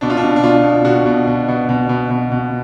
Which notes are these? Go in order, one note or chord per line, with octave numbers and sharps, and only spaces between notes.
B2 D4
F4
D4
B2
D4
B2 F4
B2
B2 F#4
B2
B2
B2
B2
B2
B2
B2